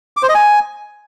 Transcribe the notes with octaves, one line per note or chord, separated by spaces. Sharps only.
D6
C5
D#5
G#5